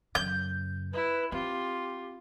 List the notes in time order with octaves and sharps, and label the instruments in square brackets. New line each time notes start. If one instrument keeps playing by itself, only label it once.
[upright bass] F#2 C#3 [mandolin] G6
[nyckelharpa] E4 [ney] B4
[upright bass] C4 [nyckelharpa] F4 [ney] G4